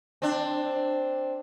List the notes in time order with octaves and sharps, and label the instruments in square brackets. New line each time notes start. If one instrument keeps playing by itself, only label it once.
[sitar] C4 D4